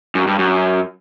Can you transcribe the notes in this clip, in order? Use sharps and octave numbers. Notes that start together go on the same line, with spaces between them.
F#2
G2
F#2